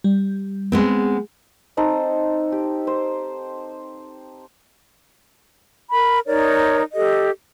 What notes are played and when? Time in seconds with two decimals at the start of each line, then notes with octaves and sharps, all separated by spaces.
0.04 G3
0.72 G#3 B3 C4
1.77 C4 D#4 A4 C5
2.52 G4
2.87 C5
5.90 A#4 B5
6.25 D#4 A#4 C#5 D5
6.94 G4 A4 D#5